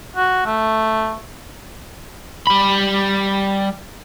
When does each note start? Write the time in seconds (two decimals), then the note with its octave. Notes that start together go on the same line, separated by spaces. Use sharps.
0.16 F#4
0.46 A3
2.47 G3 B5